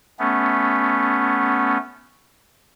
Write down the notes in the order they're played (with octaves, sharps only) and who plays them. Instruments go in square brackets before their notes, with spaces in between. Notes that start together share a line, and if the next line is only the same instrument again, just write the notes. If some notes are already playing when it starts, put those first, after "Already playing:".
[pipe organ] A3 B3 C#4